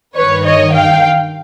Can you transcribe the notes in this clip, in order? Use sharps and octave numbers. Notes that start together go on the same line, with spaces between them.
G2 D#3 B4 C#5
C#5 D#5
F5 G5